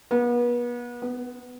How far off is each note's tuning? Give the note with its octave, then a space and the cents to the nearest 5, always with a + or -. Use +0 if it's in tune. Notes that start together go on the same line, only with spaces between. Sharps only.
B3 -35
B3 +10